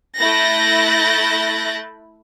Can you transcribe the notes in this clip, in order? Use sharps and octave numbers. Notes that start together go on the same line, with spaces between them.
A3 E4 F#6 G6 A6 A#6